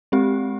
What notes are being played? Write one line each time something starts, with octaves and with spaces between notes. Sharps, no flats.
G#3 C4 G4